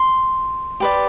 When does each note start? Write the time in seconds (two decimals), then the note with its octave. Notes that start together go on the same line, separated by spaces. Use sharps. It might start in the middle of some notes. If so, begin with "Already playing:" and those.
Already playing: C6
0.80 G4 B4 D5